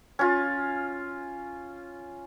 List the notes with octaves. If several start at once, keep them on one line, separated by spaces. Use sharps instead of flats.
C#4 F4